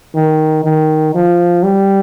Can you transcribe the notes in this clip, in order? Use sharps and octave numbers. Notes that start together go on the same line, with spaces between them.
D#3
D#3
F3
G3